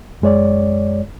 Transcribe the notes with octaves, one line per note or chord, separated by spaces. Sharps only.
F#2 G#3 C#5 D5